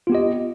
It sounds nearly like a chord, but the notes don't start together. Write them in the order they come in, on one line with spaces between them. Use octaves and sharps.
F4 B3 G4 D#5